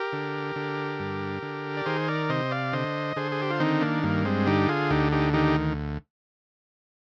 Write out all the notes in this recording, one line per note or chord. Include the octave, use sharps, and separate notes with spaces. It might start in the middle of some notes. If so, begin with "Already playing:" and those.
Already playing: G4 A#4
D3
D3
G2
D3
D5
D#3 G#4 C5
A#4 D5
C3 C5 D#5
D5 F5
D3 C5 D#5
D3 G#4 C5
G#4
G4
F4
D#3 C4 D#4
A#3 D4
G2 A#3
G#3 C4
D3 D#4 G4
F4 G#4
D2 D#4 G4
D#4 G4
D#3 D#4 G4